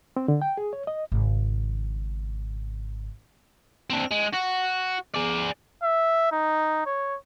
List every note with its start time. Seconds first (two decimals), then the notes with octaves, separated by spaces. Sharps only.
0.17 C4
0.28 D3
0.42 G5
0.57 G#4
0.73 C#5
0.87 D#5
1.12 G#1 C#3
3.90 C4 D4
4.11 G#3
4.33 F#4
5.15 G#4 D5
5.83 E5
6.32 D#4
6.86 C#5